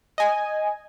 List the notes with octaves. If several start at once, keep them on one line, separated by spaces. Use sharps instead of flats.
D#5 G#5